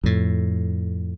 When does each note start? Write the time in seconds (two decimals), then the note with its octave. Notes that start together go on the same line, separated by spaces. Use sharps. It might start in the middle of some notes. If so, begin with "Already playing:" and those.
0.04 F2 A2